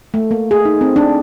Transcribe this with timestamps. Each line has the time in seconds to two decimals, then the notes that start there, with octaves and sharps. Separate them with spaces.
0.14 A3
0.31 A#3
0.51 G#4
0.65 D#4
0.81 C4
0.96 D4